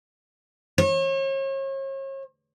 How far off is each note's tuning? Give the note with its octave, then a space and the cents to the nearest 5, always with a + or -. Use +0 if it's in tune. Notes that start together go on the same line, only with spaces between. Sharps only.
C#5 -40